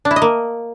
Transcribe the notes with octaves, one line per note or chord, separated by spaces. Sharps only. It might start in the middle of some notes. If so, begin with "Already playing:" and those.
D4
E4
D#5
A#3